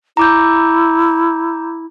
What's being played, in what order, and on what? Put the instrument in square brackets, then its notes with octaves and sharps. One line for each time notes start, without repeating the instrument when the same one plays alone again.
[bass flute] E4 [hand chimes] A#5 D6 G6